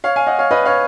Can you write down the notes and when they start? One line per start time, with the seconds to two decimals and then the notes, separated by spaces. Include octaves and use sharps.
0.04 C#5 F5
0.16 F5 G#5
0.27 D#5 F#5
0.39 C#5 F5
0.51 B4 D#5
0.65 C#5 F5